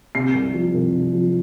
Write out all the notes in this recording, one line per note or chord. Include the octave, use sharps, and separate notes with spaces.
C3 C7
C2
F3
C2
C2
F3